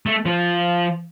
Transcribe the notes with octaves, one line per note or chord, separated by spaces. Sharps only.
A3
F3